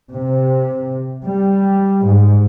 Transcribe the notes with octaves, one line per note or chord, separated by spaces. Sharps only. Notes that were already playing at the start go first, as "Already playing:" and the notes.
C3
G3
G#2